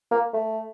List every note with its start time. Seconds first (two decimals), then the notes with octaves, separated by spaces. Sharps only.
0.11 A#3
0.34 A3